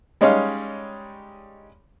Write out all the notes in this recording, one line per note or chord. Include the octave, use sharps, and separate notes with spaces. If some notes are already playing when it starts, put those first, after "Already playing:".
G3 G#3 C#4 D#4 C#5 F5